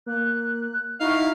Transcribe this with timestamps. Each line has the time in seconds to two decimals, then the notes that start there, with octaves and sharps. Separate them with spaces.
0.06 A#3 F#6
1.00 D#4 E4 F#4 F5